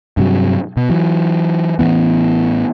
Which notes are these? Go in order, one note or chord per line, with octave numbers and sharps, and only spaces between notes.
G2 C3 F#3
B2
E3 F#3
A1 D3 E3 B3